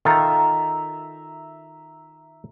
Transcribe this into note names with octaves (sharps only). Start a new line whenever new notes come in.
D#3 F4 A4 E5 A#5